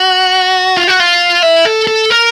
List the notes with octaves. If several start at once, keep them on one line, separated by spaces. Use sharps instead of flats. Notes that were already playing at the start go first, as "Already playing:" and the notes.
Already playing: F#4
F4
F#4
F4
E4
A4
A4
A#4